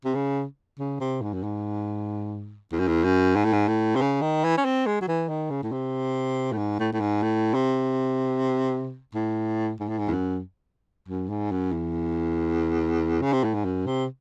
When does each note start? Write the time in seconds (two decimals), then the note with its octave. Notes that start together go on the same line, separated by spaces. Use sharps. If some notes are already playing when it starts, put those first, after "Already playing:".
0.05 C3
0.15 C#3
0.79 C#3
1.00 C3
1.22 G#2
1.33 F#2
1.43 G#2
2.72 E2
2.79 F#2
2.88 E2
3.04 F#2
3.36 G#2
3.45 A2
3.53 G#2
3.68 A2
3.95 C3
4.01 C#3
4.21 D#3
4.44 E3
4.58 C#4
4.65 C4
4.86 G#3
5.01 F#3
5.08 E3
5.29 D#3
5.51 C#3
5.63 A2
5.72 C3
6.52 A2
6.57 G#2
6.79 A2
6.93 A2
7.00 G#2
7.23 A2
7.54 C3
9.14 A2
9.80 G#2
9.89 A2
9.99 G#2
10.08 E2
10.11 F#2
11.09 F#2
11.29 G#2
11.51 F#2
11.72 E2
13.22 C#3
13.33 C3
13.44 A2
13.54 G#2
13.65 F#2
13.86 C3